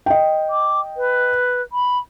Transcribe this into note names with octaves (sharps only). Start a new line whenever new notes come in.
D#5 G5
D6
B4
B5